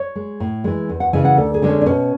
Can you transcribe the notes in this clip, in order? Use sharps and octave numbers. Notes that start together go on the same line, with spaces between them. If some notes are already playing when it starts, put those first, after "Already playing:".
Already playing: C#5
G#3
A2
E3 G#3
E2
F#5
C#3 E3 G#3 G#5
F#5
D2 A4
G#4
D3 G#3
C#4
D4
B2 C#4